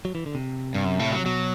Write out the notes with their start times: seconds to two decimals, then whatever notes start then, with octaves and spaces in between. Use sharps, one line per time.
0.05 F#3
0.15 E3
0.26 D3
0.35 C3
0.74 G2
0.85 F#2
0.99 A2
1.12 F#3
1.26 B2 F#3